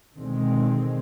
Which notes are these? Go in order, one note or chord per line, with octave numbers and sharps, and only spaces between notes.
B2 D3 D#3 G#3 C4